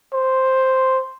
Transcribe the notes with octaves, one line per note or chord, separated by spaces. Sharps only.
C5